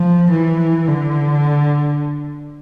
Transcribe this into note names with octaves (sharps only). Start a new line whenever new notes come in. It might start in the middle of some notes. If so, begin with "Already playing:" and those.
Already playing: F3
E3
D3